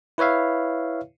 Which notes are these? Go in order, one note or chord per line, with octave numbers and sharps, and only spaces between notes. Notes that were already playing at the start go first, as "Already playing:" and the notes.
E4 B4 C#5 E5 F5